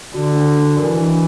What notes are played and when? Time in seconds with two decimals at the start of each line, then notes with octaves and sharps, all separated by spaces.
0.14 D3 F#4
0.36 D4
0.57 D4
0.78 E3 A#4
1.00 D4